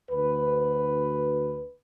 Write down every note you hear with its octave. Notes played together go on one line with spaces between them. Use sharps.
D2 B4